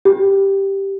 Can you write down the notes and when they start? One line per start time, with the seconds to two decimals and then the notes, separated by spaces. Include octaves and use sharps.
0.05 G4